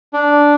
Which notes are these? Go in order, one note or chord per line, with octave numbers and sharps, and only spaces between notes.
D4